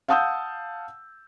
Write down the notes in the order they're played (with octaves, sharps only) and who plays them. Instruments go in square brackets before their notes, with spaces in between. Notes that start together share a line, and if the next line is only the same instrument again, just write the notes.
[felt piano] F5 F#5 A5 D#6 E6 G6